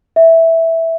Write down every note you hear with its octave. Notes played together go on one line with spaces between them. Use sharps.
E5